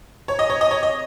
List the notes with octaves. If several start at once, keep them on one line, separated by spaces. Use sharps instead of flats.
C#5
D#5
C#5
D#5
C#5
D#5